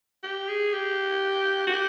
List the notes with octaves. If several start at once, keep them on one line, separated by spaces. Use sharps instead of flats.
G4
G#4
G4
F#4
G4